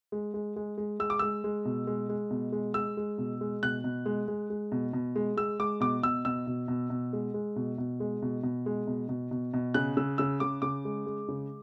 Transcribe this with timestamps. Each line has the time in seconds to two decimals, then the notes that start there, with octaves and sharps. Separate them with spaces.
0.12 G#3
0.34 G#3
0.56 G#3
0.78 G#3
0.99 G#3 E6
1.10 D6
1.19 G#3 E6
1.44 G#3
1.65 B2
1.87 G#3
2.09 G#3
2.30 B2
2.52 G#3
2.74 G#3 E6
2.97 G#3
3.18 B2
3.41 G#3
3.63 B2 F#6
3.84 B2
4.06 G#3
4.28 G#3
4.50 G#3
4.72 B2
4.93 B2
5.16 G#3
5.37 G#3 E6
5.60 G#3 D6
5.80 B2 D6
6.03 B2 E6
6.25 B2 E6
6.47 B2
6.68 B2
6.90 B2
7.13 G#3
7.34 G#3
7.56 B2
7.78 B2
8.00 G#3
8.22 B2
8.43 B2
8.66 G#3
8.87 B2
9.09 B2
9.31 B2
9.53 B2
9.74 C#3 F#6
9.97 C#3 E6
10.18 C#3 E6
10.40 C#3 D6
10.62 C#3 D6
10.85 G#3
11.06 G#3
11.29 C#3